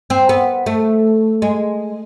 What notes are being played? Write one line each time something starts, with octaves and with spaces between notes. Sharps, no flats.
C4
B3
A3
G#3